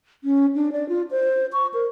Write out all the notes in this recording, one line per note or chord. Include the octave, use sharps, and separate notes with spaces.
C#4
D4
D5
F4
C5
C#6
A#4